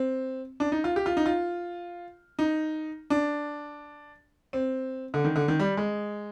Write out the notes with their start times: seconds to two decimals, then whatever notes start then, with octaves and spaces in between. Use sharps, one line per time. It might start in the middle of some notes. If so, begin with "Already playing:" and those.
Already playing: C4
0.60 D4
0.72 D#4
0.84 F4
0.96 G4
1.06 F4
1.17 D#4
1.26 F4
2.39 D#4
3.10 D4
4.53 C4
5.14 D3
5.24 D#3
5.36 D3
5.48 D#3
5.59 G3
5.77 G#3